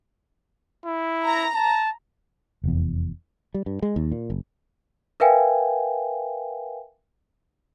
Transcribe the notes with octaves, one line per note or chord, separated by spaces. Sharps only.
E4
A#5
A5
F1 E2
G3
G2
G#3
D#2
A#2
F#1
A#4 B4 E5 F5 G5 G#5